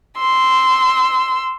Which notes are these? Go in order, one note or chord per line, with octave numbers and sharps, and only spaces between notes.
C6 E6